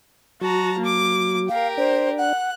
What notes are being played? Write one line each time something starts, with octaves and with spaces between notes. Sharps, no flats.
F#3 F#4 A5 A#5
A#3 D6
G4 A#4 F5
D4 C5
F#5 F#6